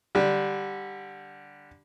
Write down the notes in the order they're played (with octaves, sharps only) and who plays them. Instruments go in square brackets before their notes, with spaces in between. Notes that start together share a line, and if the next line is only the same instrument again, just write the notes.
[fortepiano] D3 G3